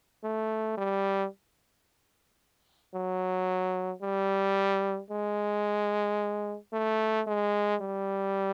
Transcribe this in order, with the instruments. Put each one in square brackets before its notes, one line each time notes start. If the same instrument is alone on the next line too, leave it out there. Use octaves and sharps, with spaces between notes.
[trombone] A3
G3
F#3
G3
G#3
A3
G#3
G3